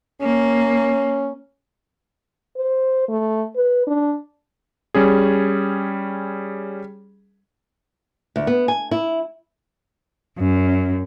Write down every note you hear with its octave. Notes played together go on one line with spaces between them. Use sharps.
A#3 C#4
C5
A3
B4
D4
G3 C#4 G#4
D2
B3
G#5
E4
F#2